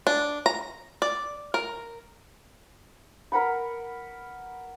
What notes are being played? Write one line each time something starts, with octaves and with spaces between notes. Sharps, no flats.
D4
A#5
D5
A#4
A#4 B4 F#5 B5